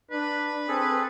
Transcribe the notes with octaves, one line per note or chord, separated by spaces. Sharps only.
D4 B4
C4 G#4 A4